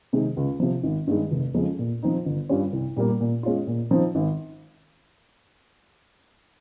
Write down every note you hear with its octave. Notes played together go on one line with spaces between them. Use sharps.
C3 D#3 G#3
C#2
C3 F3
G#1
G2 D#3 G#3
F1
F2 C#3 F3 G#3
A#2
F3 C4 D#4
G1
G2 G3 C#4 F4
C2
A#2 G3 A#3
A#2
G#3 C#4 F4
A#2
F3 C4 D#4
G#1